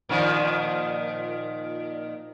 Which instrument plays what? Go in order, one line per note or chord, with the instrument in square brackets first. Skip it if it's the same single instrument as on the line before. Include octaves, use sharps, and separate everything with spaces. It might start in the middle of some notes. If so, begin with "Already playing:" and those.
[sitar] A#2 D#3 F3